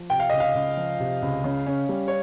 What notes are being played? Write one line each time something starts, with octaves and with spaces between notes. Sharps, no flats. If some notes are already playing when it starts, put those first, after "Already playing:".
Already playing: F3
C3 G5
F5
C#2 D#5
F5
C#2
F3
C3
C#2
C#3
C#4
G3
C#5